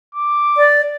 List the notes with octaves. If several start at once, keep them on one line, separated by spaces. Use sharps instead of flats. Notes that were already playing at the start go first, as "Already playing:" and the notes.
D6
D5